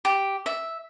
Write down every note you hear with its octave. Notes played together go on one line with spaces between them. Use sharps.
G4
E5